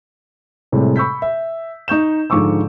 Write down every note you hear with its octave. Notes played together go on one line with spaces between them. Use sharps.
A2 C3 G3 G#3
B5 C#6 E6 G6 B6
E5
D#4 C#6 G6 E7
G#2 D3 F3 C#6 D6 E6